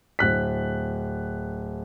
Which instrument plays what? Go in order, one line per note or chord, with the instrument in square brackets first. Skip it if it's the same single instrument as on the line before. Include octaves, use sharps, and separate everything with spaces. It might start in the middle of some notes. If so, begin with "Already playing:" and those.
[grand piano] D1 F#6 B6